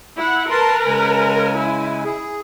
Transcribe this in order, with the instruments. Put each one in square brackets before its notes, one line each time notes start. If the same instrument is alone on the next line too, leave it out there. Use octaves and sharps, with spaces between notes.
[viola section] E4 F#5
[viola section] A#4 B4 [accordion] A5 C6
[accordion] C#3 G#3 G#5
[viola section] E4
[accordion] G#4